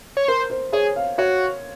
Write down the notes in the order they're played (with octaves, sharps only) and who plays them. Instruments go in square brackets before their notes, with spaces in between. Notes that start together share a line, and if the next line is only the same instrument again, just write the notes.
[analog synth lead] C#5
[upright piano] A#4 [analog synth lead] C5
[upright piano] C5
[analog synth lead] G#4 [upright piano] C#5
[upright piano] F5
[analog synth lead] F#4 [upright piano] C#5